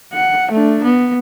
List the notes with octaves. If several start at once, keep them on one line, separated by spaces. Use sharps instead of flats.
F#5
A3 D4
B3